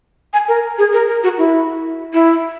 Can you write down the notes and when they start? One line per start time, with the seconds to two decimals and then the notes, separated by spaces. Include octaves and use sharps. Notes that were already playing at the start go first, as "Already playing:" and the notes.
0.33 G#5
0.48 A#4
0.78 G#4
0.93 A#4
1.08 A#4
1.23 F#4
1.38 E4
2.14 E4